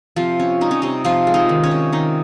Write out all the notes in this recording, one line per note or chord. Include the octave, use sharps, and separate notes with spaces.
C3 F3 F4
C#4
G3 D#4
C#4
C3 D#4
C3 F3 F4
G#3
D#4
D#3
C#4
C3
D#3 D#4